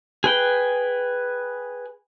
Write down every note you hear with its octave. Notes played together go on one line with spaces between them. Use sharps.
G#4 B4 G5